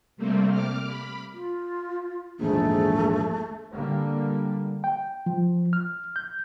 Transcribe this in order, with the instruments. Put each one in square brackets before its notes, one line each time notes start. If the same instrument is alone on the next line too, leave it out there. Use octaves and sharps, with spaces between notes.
[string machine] C3 G3 A3 A#3 C4
D6 F6
B5
[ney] F4
[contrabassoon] A#1 [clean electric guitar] E2 G#2 D#3 [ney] A3 [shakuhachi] G#4
[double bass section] D3 G3 A#3
[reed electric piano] G5
F3
F6
G6